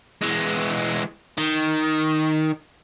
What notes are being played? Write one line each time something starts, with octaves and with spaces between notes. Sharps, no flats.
E3 G#3
D#3